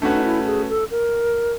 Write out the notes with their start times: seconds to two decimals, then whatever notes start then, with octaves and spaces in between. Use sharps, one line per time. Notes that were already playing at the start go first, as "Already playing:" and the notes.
0.02 A3 C#4 D4 F#4 B4
0.15 D#4
0.24 E4
0.46 G#4
0.69 A4
0.91 A#4